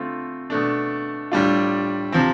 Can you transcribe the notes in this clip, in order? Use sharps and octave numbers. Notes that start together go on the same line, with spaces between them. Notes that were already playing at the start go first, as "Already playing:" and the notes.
Already playing: D3 A3 C4 F4
B2 A3 D4
A2 G3 D4 F4
C3 F3 C4